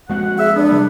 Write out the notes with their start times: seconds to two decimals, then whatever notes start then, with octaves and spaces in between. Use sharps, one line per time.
0.10 F3 G#3 C4 F#4 F#5
0.39 G#4 E5
0.55 E2 B3 D4
0.69 C3 G3 A#3